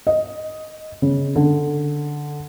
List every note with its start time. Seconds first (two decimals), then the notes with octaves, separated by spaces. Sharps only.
0.07 D#5
1.02 C#3
1.36 D3